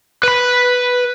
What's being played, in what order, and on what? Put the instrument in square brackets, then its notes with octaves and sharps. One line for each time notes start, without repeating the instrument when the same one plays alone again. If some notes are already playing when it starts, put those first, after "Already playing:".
[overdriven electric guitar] B4 B5